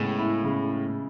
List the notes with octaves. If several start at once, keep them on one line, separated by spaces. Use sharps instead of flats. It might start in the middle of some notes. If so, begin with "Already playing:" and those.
Already playing: A2 C#3 G#3 B3
E4
C#3